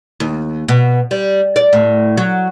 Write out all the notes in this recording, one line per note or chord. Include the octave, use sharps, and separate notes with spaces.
D#2
B2
G3
D5
A2
F#3